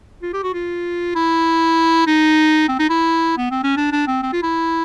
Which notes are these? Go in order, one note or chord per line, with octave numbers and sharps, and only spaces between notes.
F4
G4
F#4
F4
E4
D#4
C4
D#4
E4
B3
C4
C#4
D4
D4
C4
C4
F4
E4